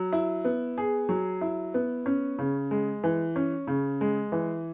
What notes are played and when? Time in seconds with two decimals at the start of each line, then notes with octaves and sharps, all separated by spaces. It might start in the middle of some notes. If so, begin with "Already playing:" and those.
Already playing: F#3
0.12 E4
0.45 B3
0.78 G#4
1.09 F#3
1.41 E4
1.74 B3
2.06 C#4
2.39 C#3
2.71 G#3
3.04 E3
3.36 C#4
3.67 C#3
4.01 G#3
4.32 E3